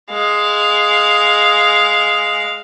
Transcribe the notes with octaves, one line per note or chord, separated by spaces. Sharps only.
G#3 F5